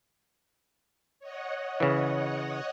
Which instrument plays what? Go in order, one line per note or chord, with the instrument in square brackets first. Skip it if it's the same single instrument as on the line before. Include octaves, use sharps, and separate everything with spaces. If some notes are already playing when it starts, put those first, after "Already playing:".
[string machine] C#5 D#5 F#5
[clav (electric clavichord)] C#3 E3